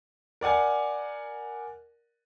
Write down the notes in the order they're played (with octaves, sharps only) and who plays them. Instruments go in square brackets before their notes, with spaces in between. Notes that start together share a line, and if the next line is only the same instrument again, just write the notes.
[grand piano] A#4 D5 F#5 G#5